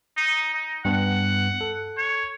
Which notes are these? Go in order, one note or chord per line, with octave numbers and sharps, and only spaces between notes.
D#4
D#4
G2 B3 F#5
A4
C#5